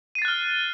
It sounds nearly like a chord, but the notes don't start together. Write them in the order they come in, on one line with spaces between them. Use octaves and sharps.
D#7 C7 A6 F#6 F6